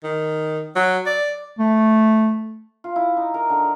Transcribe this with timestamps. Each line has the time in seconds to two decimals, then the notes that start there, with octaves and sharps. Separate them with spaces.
0.04 D#3
0.76 F#3
1.06 D5
1.59 A3
2.84 F4
2.96 E4
3.17 D#4
3.34 A#4
3.50 D3